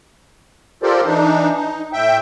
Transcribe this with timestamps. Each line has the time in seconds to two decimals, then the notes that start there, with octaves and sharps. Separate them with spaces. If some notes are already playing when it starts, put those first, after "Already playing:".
0.83 F4 G4 A4 A#4 C5 D5
1.06 E3 D4 D#4
1.55 D#4
1.93 A2 E5 G5